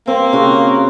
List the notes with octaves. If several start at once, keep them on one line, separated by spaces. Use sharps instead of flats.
A#3 C4
C#3 F#4